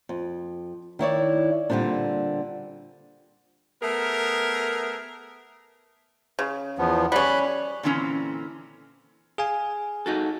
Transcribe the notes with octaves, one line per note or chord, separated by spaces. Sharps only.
F2
D#3 E4 C#5 D5
A#2 D3 F3 G3 C4 D4
A3 B3 G#4 A#4
C#3
E2 F3 B3
G3 C#4 B5 F#6
A#2 D3 E3 C4 C#4 A#5
G#4 F5 G#5
D#4 F#4 A4